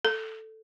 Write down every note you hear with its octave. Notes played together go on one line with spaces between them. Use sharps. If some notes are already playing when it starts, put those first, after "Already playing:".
A4